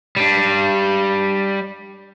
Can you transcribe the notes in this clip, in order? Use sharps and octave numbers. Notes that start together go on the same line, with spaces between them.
G3 D4